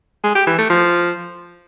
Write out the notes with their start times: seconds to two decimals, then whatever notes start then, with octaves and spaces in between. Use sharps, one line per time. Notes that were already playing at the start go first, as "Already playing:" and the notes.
0.24 G#3
0.35 G4
0.47 E3
0.58 A3
0.70 F3